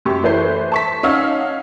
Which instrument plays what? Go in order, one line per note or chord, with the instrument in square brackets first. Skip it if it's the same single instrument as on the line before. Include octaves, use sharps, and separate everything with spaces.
[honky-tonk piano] F#2 G4 C#6
E3 A3 B4 C5 G6 C7
A5 C#6 B6
C#4 D#4 F5 F#5 E6 F6